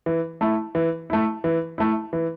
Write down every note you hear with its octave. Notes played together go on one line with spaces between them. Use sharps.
E3
A3 E4
E3
A3 E4
E3
A3 E4
E3